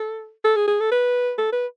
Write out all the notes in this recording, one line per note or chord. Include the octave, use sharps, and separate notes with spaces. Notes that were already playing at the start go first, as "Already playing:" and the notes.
Already playing: A4
A4
G#4
G#4
A4
B4
A4
B4